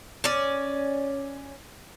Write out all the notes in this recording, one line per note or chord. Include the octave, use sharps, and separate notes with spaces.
C#4 D5